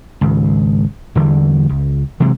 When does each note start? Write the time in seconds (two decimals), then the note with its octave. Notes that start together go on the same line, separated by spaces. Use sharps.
0.21 G#1 C#2
1.16 E2 D3 E3 G3
1.69 C#2
2.20 C3 E3 F#3 G#3